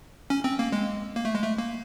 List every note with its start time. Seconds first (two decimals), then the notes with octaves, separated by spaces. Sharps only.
0.30 C#4
0.44 C4
0.59 A#3
0.72 G#3
1.16 A#3
1.25 A3
1.35 G#3
1.44 A3
1.58 A#3